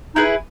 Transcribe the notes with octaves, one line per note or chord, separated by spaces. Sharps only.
D#4 E4 G#4 B4